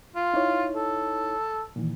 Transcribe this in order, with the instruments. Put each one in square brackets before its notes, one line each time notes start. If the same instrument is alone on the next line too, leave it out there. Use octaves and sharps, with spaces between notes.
[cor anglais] F4
[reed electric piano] D#4 E4 C#5
[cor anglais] A4
[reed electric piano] A#2 D#3 E3